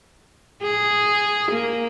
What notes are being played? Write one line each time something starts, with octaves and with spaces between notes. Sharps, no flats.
G#4
A#3